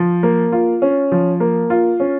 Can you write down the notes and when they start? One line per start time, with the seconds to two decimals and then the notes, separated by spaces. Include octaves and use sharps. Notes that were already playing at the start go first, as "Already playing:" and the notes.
Already playing: F3
0.23 A#3
0.52 F4
0.82 C#4
1.12 F3
1.40 A#3
1.70 F4
2.00 C#4